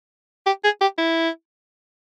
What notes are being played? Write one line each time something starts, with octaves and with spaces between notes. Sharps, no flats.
G4
G#4
G4
E4